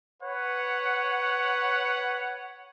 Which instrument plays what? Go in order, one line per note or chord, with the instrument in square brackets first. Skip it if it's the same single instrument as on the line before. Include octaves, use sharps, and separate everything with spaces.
[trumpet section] B4 C#5 F#5